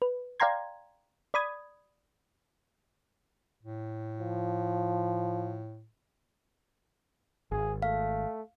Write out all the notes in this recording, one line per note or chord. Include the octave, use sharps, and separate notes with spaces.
B4
D5 F5 G5 A#5 C6 G#6
D5 B5 D#6 G#6
A2
F3
G#1 G#4
A3 F5